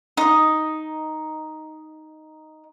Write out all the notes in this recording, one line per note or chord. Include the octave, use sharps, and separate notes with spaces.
D#4 D#5